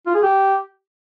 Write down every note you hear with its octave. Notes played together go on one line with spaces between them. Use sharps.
F4
G#4
G4